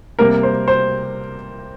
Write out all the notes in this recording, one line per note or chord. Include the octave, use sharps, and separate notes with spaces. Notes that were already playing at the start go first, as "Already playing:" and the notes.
C3 G3 A#3 A#4
C5
C5